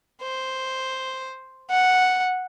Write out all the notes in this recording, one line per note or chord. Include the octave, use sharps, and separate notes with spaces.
C5
F#5